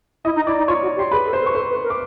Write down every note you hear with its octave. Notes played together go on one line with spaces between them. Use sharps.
E4 D#5 D#6
D#4
E4 D5 D6
D#4
F4 C#5 C#6
F#4
G4
C6
G#4 B4 B5
A4
C5 C6
A4
C#6
A4 C5 C6
B4
A#4
D6